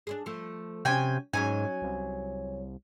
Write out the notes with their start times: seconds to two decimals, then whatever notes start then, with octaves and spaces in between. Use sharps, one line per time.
0.07 D4 E4 G#4
0.26 F3 A3
0.85 C3 C#4 F#4 G5 G#5
1.33 G#2 F#3 C#4 D#4 G#5
1.82 C2